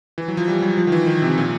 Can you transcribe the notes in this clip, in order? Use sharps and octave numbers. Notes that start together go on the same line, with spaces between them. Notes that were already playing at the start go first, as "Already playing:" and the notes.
E3
F#3
F3
G3
F#3
F3
D#3
E3
D#3
C3
A#2